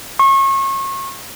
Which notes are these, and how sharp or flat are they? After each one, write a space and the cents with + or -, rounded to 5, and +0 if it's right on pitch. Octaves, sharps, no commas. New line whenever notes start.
C#6 -35